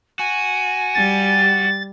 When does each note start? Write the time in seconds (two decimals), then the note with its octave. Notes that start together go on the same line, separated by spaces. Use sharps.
0.19 F#4 G#5
0.95 G3 G4 A6